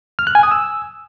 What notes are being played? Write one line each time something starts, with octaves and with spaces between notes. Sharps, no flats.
F6
F#6
G#5
D#6
E6